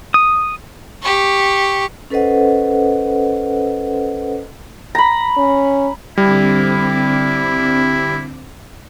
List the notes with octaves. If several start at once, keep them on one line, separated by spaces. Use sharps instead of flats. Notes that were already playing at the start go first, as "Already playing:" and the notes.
D#6
G4 C#6
C#4 A4 B4 C5 D#5 F#5
A#5 B5
C#4
D3 G3 C4 E4 D6